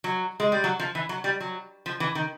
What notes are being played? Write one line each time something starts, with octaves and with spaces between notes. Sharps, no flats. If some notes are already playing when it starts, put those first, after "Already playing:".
F#3
G#3
G3
F#3
F3
E3
F#3
G3
F#3
F3
E3
D#3